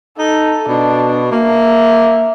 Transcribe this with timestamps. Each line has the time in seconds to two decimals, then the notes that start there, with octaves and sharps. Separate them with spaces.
0.18 D#4 A4
0.68 B2 D4
1.32 A#3 E5